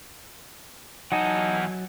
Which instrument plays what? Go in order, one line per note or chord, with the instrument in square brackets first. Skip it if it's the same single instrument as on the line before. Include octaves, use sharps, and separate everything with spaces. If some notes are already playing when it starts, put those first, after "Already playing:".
[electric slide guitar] E2 F#5 [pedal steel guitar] F#3 G#5 A5 [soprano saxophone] D#4